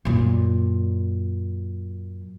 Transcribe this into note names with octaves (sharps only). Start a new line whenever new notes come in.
F#2 A#2